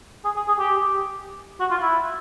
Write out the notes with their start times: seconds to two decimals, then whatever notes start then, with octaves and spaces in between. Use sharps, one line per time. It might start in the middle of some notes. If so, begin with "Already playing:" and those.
0.24 G#4
0.36 G#4
0.48 G#4
0.58 G4
1.60 F#4
1.71 F4
1.82 E4